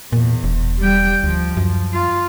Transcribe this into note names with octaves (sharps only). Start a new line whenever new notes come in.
E2 A#2
E1
G3 G5
D2 F3
F#2
F4